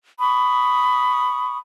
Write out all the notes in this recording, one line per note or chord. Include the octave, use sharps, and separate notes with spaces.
B5 C#6 D#6